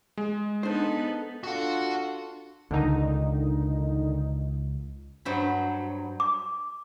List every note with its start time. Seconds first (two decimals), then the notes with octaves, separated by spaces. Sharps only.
0.17 G#3
0.63 B3 D4 D#4 A4 C5
1.44 D4 F4 F#4 A4 F#5
2.71 C#2 D3 D#3 D#4
5.25 G2 F#3 C5 B5
6.20 D6